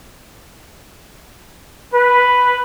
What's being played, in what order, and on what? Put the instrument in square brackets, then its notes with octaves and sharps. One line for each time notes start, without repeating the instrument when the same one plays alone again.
[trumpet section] B4